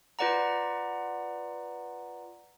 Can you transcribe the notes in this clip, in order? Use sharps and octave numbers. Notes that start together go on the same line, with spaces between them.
F4 B4 D5 F#5 A#5